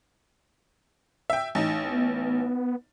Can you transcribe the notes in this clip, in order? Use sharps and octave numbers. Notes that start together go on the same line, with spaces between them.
E5 G5
A1 D#4
B3